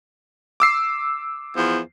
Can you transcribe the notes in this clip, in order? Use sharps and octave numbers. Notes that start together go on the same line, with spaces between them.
D6 E6 C7
E2 F3